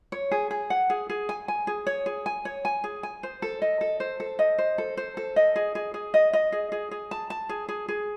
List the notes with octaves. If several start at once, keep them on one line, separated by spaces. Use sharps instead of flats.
C#5
G#4
G#4
F#5
G#4
G#4
G#5
G#5
G#4
C#5
G#4
G#5
C#5
G#5
G#4
G#5
C5
A4
D#5
A4
C5
A4
D#5
C5
A4
C5
A4
D#5
G#4
G#4
G#4
D#5
D#5
G#4
G#4
G#4
A5
A5
G#4
G#4
G#4